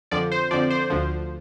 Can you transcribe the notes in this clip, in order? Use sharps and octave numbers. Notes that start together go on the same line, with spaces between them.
F2 D3 F3 D5
C5
F2 D3 F3 D5
C5
D2 D3 F3